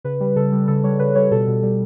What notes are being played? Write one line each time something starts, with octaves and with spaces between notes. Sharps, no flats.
C#3 B4
G3
C#3 A4
G3
C#3 A4
G3 C#5
C#3 B4
G3 C#5
B2 A4
B2
G3